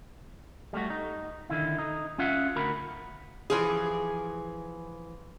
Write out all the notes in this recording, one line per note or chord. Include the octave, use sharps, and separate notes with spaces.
G3 A3 F#4
D#4
D3 D#3 E4
D#4
C#4 F4 E5 F#5
D2 F#4 A#4 B5
E3 F3 G#4